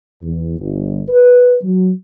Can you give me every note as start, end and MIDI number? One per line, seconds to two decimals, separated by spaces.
0.22 0.55 40
0.59 1.01 31
1.08 1.55 71
1.61 1.90 54